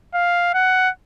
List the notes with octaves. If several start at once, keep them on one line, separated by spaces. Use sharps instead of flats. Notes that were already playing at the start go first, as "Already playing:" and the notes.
F5
F#5